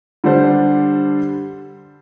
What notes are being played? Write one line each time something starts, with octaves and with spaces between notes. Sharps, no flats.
D3 G3 D4 A4 C5